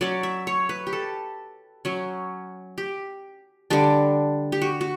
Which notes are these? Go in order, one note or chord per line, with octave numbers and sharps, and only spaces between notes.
F#3 C#4 D5
E5
C#5
B4
G4
A4
F#3 C#4
G4
D3 G3 D4
G4
F#4
F#4